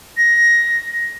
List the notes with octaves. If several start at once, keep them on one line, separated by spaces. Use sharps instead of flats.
A#6